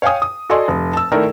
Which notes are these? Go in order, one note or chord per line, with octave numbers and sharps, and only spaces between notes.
C#5 F5 G5 G#5 D#6
D#6
F#4 A4 D5 D#5 G#5 C6
F1
A5 E6
D#3 A3 D#4 E4 A#4 D5